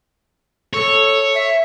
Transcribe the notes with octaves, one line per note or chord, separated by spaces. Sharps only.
A4 C#5
E5